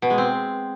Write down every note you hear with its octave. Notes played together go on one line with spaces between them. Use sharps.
B2
G#3
C4